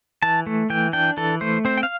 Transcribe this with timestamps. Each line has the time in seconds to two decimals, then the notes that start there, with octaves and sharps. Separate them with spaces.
0.22 E3 A5
0.47 A3
0.70 E3 G5
0.93 D4 G5
1.17 E3 A4
1.41 A3 C5
1.65 C4 C5
1.77 G5
1.83 F5